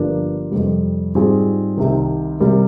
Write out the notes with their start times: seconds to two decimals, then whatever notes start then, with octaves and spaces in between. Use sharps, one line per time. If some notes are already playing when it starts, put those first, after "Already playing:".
Already playing: G1 G2 F3 A#3 D4
0.51 F2 C3 G3
1.15 G#2 G3 C4 F4 G#4
1.77 C2 C3 D#3
2.40 C3 G3 A#3